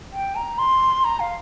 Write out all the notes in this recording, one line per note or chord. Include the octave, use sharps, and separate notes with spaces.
G5
A#5
C6
A#5
F5